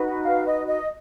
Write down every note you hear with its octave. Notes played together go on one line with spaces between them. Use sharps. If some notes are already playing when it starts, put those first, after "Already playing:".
Already playing: D#4 F#4 B4
F5
D#5
D#5